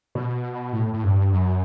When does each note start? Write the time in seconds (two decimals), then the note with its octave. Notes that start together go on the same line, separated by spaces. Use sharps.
0.15 B2
0.73 A2
0.94 A2
1.04 G2
1.32 F#2